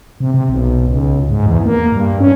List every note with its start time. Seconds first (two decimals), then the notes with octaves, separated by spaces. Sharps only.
0.20 C3
0.34 C3
0.50 B1
0.89 C#2
1.30 G#2
1.46 E2
1.65 A#3
1.92 G2
2.20 C#4